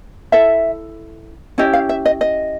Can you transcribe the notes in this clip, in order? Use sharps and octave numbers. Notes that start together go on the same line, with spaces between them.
E4 A4 E5
C#4 E4 G4 D#5
F5
E5
D#5
D#5